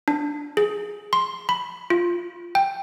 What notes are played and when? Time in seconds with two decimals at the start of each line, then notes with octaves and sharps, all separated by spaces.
0.08 D4
0.57 G#4
1.13 C6
1.49 B5
1.90 F4
2.55 G5